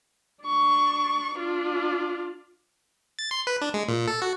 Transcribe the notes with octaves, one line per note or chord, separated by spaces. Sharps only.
D4 C#6
D4 F4
A6
C6
B4
D4
G#3
A#2
A4
F#4